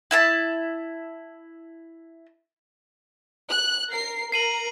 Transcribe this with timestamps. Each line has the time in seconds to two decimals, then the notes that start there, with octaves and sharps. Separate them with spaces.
0.11 E4 E5 A5
3.49 F#6
3.91 A#4 C7
4.32 A#4 C7 D#7 F#7